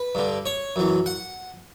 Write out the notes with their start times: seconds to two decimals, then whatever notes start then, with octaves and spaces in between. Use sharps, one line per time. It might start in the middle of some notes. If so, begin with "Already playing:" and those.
Already playing: B4
0.15 G2 D3
0.46 C#5
0.76 F#2 E3
1.06 F#5